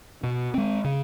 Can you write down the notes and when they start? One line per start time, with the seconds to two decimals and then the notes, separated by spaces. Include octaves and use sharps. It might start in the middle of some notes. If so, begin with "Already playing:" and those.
0.23 B2
0.54 G#3 C4
0.84 C#3